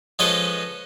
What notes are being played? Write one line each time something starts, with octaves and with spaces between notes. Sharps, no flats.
F3 G#3 C#4 A4 B4 D#5